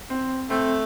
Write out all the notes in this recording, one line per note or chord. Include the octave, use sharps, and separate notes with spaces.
C4
A3 C4